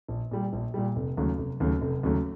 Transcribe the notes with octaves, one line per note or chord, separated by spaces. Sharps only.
A#1
A#2 G3
A#1
A#2 G3
F1
D#2 C#3 F#3 A3
F1
D#2 C#3 F#3 A3
F1
D#2 C#3 F#3 A3